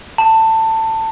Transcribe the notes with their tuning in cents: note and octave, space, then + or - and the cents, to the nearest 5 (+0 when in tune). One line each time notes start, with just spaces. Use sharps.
A5 +20